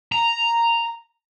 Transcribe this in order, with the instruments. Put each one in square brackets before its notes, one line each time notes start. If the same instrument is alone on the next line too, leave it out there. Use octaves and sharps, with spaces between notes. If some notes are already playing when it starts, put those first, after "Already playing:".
[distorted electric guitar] A#5